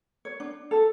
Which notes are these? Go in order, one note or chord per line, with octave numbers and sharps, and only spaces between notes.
C#5
D4
A4